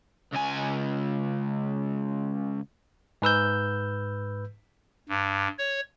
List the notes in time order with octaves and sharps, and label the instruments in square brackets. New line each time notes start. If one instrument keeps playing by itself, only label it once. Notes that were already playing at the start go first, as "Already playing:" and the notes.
[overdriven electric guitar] C#2 G#5
[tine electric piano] G#2 B4 E6 G6
[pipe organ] G2
C#5